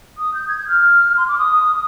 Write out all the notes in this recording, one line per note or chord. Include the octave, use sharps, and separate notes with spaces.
D#6
G6
G#6
G6
F6
C6
D6
D#6